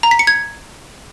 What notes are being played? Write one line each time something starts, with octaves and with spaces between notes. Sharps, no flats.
A#5
B6
C#7
G#6